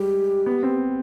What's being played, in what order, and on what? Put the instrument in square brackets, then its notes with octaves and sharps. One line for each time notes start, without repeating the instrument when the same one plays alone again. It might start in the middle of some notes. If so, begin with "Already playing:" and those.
Already playing: [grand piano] G3 G#3 [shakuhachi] G4
[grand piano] B3
C4